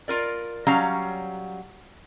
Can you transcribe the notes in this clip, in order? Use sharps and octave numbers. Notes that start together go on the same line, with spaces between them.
F4 A#4 D5
F#3 G3 C#4 F5 A#5